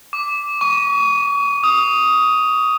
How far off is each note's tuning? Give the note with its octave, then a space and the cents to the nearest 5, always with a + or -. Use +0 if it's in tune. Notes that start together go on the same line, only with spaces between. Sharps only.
D6 -5
C#6 +35
D#6 +10